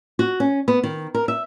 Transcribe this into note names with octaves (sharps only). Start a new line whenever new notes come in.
F#4
C#4
B3
D#3
A#4
E5